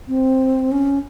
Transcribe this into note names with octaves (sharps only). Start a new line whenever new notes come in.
C4
C#4